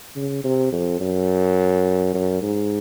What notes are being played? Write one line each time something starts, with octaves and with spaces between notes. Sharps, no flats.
C#3
C3
F2
F#2
F#2
G#2